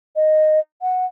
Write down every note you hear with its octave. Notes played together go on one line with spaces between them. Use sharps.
D#5
F#5